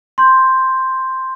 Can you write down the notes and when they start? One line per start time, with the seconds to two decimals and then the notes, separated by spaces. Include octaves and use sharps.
0.18 C6 G6